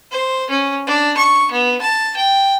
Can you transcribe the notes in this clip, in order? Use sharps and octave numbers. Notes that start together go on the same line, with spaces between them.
C5
C#4
D4
C#6
B3
A5
G5